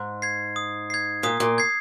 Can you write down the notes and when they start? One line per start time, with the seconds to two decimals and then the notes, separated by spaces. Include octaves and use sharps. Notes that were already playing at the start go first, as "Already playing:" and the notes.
Already playing: G#2
0.22 G#6 C7
0.56 D#6
0.90 G#6 C7
1.23 A#2 D#6
1.40 A#2
1.58 G#6 C7